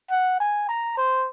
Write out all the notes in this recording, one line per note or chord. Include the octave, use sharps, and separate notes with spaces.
F#5
G#5
A#5
C5